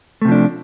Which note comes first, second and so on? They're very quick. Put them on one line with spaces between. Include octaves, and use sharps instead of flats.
A3 C3 F3 D4